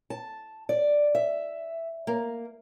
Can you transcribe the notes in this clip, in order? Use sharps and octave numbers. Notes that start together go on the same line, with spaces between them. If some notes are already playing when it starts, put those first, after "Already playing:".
A5
D5
E5
A#3